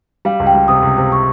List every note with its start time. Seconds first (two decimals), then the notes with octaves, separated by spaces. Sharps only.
0.25 G3 F5
0.40 C#2
0.47 G5
0.54 G3
0.68 C3 D#6
0.83 C#2
0.98 C3
1.12 C#6